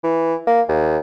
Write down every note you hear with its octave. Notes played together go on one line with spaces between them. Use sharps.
E3
A#3
D#2